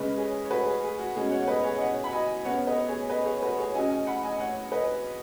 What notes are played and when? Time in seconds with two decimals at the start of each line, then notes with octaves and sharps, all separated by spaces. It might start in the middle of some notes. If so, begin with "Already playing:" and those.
Already playing: C#3 G#3 C#4 B4 D#5
0.18 G#4 C#5
0.45 C#5
0.50 F#4 B4
0.66 G#4
0.83 G#4
0.99 F#4
1.15 B2 G#3 C#4 G#4
1.32 C#5 F#5
1.42 F#5
1.48 B4 D#5
1.64 G#4 C#5
1.75 D#5
1.81 C#5 F#5
2.04 B5
2.12 D#5 G#5
2.45 C#3 B3 C#5 F#5
2.67 B4 D#5
2.88 G#4 C#5
3.09 B4 D#5
3.26 G#4 C#5
3.43 F#4 B4
3.58 G#4 C#5
3.75 C#3 F#3 C#4 D#5 G#5
3.91 D#5 G#5
4.07 F#5 B5
4.24 D#5 G#5
4.40 C#5 F#5
4.72 B4 D#5